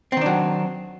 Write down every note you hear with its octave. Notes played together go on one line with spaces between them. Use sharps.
D#3 F#3 C4 D4